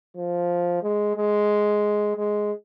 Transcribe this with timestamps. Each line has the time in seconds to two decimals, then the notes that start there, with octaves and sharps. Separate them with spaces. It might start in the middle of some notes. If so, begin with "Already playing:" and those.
0.17 F3
0.83 G#3
1.17 G#3
2.17 G#3